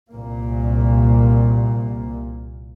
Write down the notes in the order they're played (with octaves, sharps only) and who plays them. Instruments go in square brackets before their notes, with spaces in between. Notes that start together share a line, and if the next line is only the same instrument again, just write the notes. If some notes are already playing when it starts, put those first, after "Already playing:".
[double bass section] C2 A#2 A#3